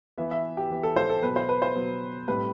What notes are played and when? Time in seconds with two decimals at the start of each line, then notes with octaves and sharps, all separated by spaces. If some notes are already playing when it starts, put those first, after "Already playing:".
0.18 E3 B3 E5
0.31 E5
0.57 G4
0.70 E3 B3
0.83 A4
0.96 C5
1.10 A4
1.22 B2 F#3 B3 B4
1.36 C5
1.49 B4
1.62 C5
1.75 B2 F#3 B3
2.28 A2 G3 C4 B4